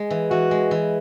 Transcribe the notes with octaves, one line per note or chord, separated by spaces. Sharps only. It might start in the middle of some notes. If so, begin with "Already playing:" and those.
Already playing: G#3
E3
E3 F#4
G#3
E3